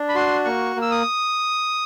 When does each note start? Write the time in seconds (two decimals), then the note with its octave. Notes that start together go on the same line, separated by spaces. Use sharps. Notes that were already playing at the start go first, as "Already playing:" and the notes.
Already playing: D4
0.09 B5
0.15 F#4 C6
0.45 A#3 C#6
0.76 A#3
0.82 E6
0.91 D#6